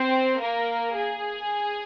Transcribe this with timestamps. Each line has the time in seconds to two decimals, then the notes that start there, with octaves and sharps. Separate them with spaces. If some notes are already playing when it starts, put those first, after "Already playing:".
Already playing: C4 C5
0.41 A#3 A#4
0.96 G#4